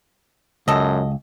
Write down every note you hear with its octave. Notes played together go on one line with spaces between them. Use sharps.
C#2 F#2 A4 D#5